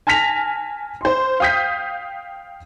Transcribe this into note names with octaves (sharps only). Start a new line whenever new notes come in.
G#5 A5 F6 A#6 B6 F7
C5 C6
F5 G5 D#6 G6 B6